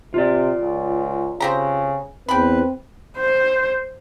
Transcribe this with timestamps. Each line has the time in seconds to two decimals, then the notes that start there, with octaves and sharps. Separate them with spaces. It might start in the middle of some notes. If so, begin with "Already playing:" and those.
0.14 C3 F4 D5
0.60 C#2
1.40 C#3 C4 G4 A#5
2.29 E2 C4 B4 G5 B5
3.17 C5